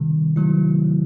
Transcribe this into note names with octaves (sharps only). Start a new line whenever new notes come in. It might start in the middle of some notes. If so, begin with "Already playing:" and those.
Already playing: C3 D#3 G3
C3 D#3 F#3 A3 E4